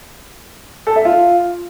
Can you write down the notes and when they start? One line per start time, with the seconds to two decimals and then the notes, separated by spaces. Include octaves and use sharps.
0.87 A4
0.96 E5
1.05 F4